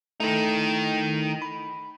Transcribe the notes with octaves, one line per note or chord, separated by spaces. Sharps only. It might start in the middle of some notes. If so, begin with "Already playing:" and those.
D#3 A3 D#4 E4 A4
B5